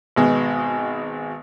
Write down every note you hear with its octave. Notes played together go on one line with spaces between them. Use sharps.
G#1 B2 G#3